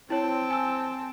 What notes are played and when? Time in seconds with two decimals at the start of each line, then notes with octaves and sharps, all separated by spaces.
0.10 C4 E4 C#5 G5 A5
0.50 G#5 E6